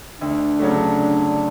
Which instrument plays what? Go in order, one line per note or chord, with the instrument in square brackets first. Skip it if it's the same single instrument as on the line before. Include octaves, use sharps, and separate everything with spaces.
[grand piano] D2 [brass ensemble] D4
[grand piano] C#3 F#3 A3